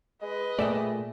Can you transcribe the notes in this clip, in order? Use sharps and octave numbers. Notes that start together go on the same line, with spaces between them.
G#3 B4 D#5
A#2 A3 G#4 D5 E5 G5